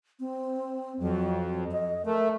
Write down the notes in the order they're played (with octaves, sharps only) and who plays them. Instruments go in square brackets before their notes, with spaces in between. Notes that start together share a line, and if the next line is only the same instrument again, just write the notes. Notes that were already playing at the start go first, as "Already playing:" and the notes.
[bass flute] C4
[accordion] F2 [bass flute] F#3
[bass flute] D#5
[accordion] A3 [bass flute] A#4